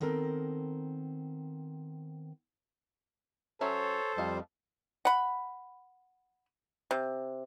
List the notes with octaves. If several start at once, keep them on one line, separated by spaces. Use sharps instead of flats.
D#3 B3 C4 A4 A#4
F#3 C#4 A4 C5 C#5 E5
F2 G3 A3 D#5 F5
F#5 B5
C3